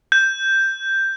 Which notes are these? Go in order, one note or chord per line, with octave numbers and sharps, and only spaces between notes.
G6